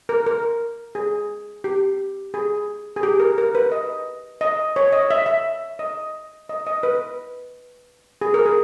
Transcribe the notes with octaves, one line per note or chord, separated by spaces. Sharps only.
A#4
A#4
G#4
G4
G#4
G#4
G4
A#4
A#4
B4
D#5
D#5
C#5
D#5
E5
E5
D#5
D#5
D#5
B4
G#4
A#4
G#4